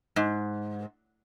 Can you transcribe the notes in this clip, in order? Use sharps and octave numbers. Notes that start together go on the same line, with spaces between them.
G#2